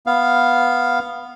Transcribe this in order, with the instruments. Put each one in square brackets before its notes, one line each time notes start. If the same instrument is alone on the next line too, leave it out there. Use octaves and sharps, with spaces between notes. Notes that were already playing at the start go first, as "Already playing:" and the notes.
[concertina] B3 F5